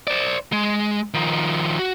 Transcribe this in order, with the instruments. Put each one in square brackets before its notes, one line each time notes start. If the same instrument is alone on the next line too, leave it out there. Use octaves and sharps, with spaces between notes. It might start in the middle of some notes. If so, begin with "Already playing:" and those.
[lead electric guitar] C5 D5
G#3
D#3 F3
F#4